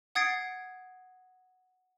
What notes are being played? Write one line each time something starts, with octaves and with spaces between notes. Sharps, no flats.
F#5 D#6 G#6 A6 C7 D7